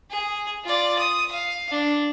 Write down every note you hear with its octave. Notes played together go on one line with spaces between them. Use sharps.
G#4
F4 D5
D#6
F5
D4